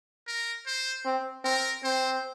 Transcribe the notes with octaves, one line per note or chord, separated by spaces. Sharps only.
A#4
C5
C4
C4 A#4
C4 C5